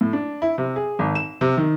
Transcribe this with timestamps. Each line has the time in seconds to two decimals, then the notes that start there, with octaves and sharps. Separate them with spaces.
0.01 A2
0.13 D4
0.42 E4
0.58 C3
0.76 G#4
0.99 G#1
1.15 E7
1.41 C3
1.57 D#3